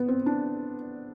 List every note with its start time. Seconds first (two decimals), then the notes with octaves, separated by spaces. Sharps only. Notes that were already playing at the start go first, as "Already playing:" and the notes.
Already playing: B3
0.08 C4
0.26 D4